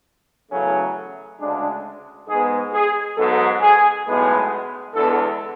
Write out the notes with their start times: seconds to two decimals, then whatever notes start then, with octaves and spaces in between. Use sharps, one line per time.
0.51 E2 C#3 F#3 A3 C#4
1.40 D2 C#3 G#3 D4
2.28 G#2 G#3 B3 G#4
2.73 G#4
3.17 G#2 F#3 B3 A4
3.61 G#4
4.06 B1 A2 G#3 B3 G#4
4.94 E2 D3 G#3 B3 A4